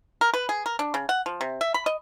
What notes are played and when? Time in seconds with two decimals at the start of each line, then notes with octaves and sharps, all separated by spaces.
0.21 A#4
0.34 B4
0.49 G#4
0.66 A#4
0.79 D4
0.94 C#3
1.09 F#5
1.26 F3
1.41 C3
1.61 E5
1.74 B5
1.86 D#5